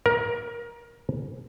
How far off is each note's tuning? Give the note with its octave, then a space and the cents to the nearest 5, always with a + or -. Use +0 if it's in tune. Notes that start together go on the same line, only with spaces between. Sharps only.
A#4 +20